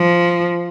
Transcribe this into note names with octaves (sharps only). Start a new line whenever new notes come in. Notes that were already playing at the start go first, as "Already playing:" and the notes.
Already playing: F3